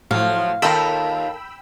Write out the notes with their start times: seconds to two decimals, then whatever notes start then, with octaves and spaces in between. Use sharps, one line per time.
0.11 A2 F3 F#3 F5
0.62 D#2 F4 A4 A#4 D#5 G5 B5 E6